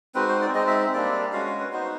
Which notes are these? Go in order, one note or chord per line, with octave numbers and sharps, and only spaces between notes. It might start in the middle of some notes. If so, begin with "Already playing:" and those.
G#3 C4 D#4 F#4 B4
C5
D5
G#3 C4 D#4 D#5
E5
E5
G3 A#3 D4 D5
G#3 C#4 F#4 F5
F5
B4
B3 D#4 F#4 C5